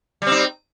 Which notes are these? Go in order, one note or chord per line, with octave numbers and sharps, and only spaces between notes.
G3 C4 D#4